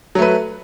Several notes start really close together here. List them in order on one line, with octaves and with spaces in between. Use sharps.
F#3 A3 B4